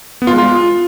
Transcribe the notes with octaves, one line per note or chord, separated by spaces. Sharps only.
B3
F4
G#3
F4